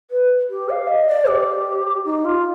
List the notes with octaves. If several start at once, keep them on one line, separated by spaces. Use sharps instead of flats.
B4
G4
F5
D#5
D5
G4
D#4
F4